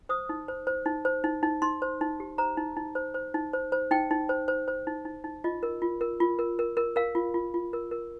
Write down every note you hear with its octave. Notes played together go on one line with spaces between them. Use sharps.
C5 D#6
D#4
C5
C5
D#4
C5
D#4
D#4
D#4 C6
C5
D#4
G4
C5 A#5
D#4
D#4
C5
C5
D#4
C5
C5
D#4 G5
D#4
C5
C5
C5
D#4
D#4
D#4
F4 D#5
A#4
F4
A#4
F4
A#4
A#4
A#4
A#4 F5
F4
F4
F4
A#4
A#4